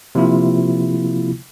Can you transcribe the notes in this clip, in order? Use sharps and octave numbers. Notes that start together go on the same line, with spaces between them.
C3 F3 A#3 E4 F4